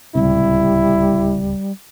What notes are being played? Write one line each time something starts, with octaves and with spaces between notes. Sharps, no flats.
D1 C#2 C3 G3 E4